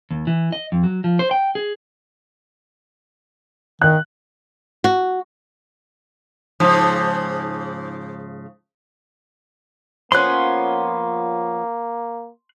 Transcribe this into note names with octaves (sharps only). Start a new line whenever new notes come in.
D#2
E3
D#5
F2
F#3
F3
C5
G5
G#4
D#3 F#6
F#4
G#2 C#3 F3
F3 A#3 B3 C#4 C6 F#6